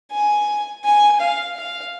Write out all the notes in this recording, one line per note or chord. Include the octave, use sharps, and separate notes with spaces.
G#5
G#5
F5
F5